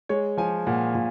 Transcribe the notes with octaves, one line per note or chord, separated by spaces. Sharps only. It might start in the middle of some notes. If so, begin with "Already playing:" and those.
G#3 C#5
F3 G#5
A#2 F#5
A#2